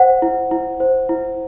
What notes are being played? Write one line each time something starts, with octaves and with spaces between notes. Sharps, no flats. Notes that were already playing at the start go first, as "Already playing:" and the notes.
Already playing: C5 F#5
E4
E4
C5
E4